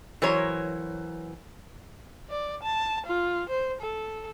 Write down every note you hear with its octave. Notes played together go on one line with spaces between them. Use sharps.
E3 F#3 A#4 C5 C#5
D5
A5
F4
C5
A4